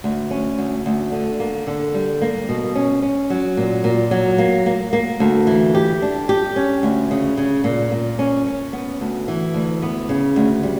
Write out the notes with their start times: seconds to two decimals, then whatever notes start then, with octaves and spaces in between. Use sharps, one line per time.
0.04 D2
0.31 C#4
0.58 D2
0.86 D2
1.12 D3
1.40 A#3
1.67 D3
1.94 G3
2.22 A#3
2.49 B2
2.75 C#4
3.02 C#4
3.30 F#3
3.57 A#2
3.84 A#2
4.11 F#3
4.38 A#3
4.66 A#3
4.93 A#3
5.20 D2
5.47 E3
5.75 G4
6.02 D4
6.29 G4
6.56 C#4
6.83 D2
7.11 C#3
7.37 C#3
7.64 A#2
7.92 A#2
8.19 C#4
8.46 C#4
8.73 B3
9.01 D2
9.28 E3
9.54 D2
9.82 B3
10.09 C#3
10.36 D2
10.63 G3